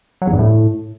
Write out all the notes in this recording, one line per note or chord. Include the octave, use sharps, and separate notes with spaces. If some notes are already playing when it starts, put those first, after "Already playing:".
F#3
E2
G2
A2